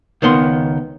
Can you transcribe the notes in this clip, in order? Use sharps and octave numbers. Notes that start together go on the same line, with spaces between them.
C#2 D#3 B3 C6